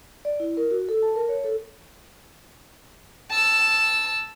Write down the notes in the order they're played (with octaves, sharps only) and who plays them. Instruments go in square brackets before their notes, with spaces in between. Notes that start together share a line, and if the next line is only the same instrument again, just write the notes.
[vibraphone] D5
E4
A#4
F#4
A4
A5
A#4
C#5
A4
[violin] A5 E6